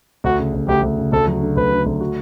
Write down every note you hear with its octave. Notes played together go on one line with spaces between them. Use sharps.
D2 F#4
C#3
D2
D2 G4
D2
C#3
D2 A4
F#3
D3
D2 B4
D3
D2
F#4